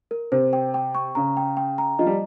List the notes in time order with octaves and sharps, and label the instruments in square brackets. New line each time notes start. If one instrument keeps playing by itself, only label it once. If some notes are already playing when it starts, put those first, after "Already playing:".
[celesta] A#4
[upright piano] C3 [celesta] C5
[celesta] G5
G5
C#6
[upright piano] C#3 [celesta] A#5
[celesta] G5
G5
A#5
[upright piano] F3 [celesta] D#5
[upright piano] G3